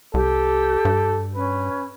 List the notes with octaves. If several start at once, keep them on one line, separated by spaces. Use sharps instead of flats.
C2 G4 A4
G2
C#4 B4